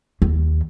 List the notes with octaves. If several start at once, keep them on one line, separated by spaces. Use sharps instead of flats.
D#2